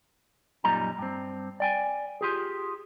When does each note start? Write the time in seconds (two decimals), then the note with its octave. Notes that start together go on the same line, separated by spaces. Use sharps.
0.64 F#2 A#2 G3 D#4 A#5
0.98 G2 C4
1.60 D5 G5 G#5
2.21 F4 G4 G#4